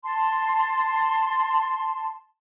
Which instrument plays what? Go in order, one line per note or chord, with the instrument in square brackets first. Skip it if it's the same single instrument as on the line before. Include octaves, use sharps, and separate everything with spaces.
[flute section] A5 C6